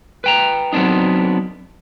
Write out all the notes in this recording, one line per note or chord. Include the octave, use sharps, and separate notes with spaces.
B4 G5 A#5
F#3 B3 C4 D4 D#4